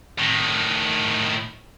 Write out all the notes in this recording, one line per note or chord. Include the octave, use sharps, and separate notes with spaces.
A2 D#3